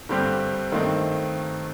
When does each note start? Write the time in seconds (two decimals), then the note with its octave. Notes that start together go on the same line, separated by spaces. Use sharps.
0.09 G2 D3 G3 C4 G4
0.72 G2 D#3 A3 C4 D#4